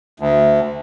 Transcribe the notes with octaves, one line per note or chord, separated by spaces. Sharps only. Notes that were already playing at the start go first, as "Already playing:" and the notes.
D2